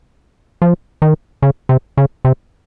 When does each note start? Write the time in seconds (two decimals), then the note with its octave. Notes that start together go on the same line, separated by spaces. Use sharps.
0.62 F3
1.02 D#3
1.42 C#3
1.69 C3
1.97 C#3
2.25 C3